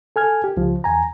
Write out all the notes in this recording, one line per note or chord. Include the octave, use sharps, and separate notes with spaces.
A4 G#5 F6 G#6
G4
C#2 F3
E2 G#5 A#5